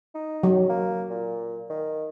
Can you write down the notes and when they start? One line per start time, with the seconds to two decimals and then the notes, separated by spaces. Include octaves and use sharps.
0.15 D#4
0.43 F#3
0.69 A#3
1.10 A#2
1.70 D#3